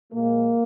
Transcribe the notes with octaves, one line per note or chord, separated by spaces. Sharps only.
A#2 F3 G#3 A#3